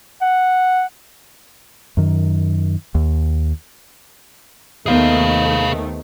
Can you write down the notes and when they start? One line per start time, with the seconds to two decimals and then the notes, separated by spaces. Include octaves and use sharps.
0.21 F#5
1.97 F#2 D#3
2.95 D#2
4.86 D#2 D#3 A3 B3 G#4 C5 D#5 F5